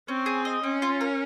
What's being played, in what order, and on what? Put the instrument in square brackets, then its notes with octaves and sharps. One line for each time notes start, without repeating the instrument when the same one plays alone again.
[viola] C4 [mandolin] C#4
[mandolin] G#4
D#5
[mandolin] C4 [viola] C#4
[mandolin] F4
A#4